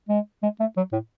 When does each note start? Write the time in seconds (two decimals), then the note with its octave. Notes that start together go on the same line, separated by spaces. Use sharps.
0.09 G#3
0.43 G#3
0.60 A3
0.77 F#3
0.93 A2